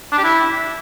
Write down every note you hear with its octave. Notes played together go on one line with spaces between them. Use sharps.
D4
G4
E4